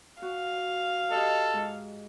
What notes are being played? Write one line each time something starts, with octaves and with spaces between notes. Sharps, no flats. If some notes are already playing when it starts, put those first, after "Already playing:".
F#4 F5
G4 A4 D#5
G#2